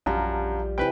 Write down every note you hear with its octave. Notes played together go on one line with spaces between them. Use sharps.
A#1 F#2 G3 F4 G4 F5 A5 A#5
C3 E3 B4 G5